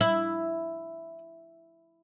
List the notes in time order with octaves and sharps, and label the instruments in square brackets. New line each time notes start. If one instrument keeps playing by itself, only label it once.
[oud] E4